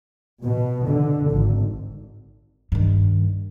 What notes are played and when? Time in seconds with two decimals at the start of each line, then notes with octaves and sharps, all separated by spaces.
0.44 B2
0.87 D3
1.30 G#1
2.72 G2 D#3